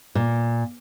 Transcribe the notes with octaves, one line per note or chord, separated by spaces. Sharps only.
A#2